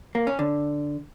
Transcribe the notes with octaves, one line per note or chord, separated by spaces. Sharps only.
A#3
C#4
D3